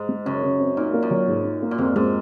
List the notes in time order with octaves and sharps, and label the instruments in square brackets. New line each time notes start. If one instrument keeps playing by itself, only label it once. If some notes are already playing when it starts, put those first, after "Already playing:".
Already playing: [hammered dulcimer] G#2
[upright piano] G#3
[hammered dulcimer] F#2 [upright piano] C#3
[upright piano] C#3
C4
[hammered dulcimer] A#2 [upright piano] D#4
[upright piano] A#3
[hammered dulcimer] F#2
[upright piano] F#3
G#2
D#4
A#3
[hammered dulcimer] A#2
[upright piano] F2 [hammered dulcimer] G#2
[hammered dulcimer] G#2 [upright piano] G#3